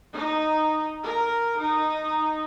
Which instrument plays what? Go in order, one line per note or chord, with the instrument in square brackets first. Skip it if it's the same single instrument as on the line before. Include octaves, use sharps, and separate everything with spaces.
[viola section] D#4
A#4
D#4